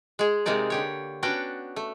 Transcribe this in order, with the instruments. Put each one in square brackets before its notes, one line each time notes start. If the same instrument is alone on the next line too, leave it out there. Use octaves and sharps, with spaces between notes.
[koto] G#3 G#4
C3 G#3 A#3 D#4 D5
D3 G4 C#5
B3 C#4 D4 F#4 G5 A5
A3